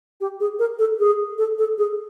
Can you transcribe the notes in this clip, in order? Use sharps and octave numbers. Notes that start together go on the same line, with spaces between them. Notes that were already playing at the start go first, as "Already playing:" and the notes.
G4
G#4
A#4
A4
G#4
A4
A4
G#4